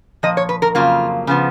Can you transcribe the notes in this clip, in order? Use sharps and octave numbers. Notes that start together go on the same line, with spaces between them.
A#2 F3 D#5
C#5
B4
A#4
F2 C#3 F#3 A#3 F4
C#3 F3 B3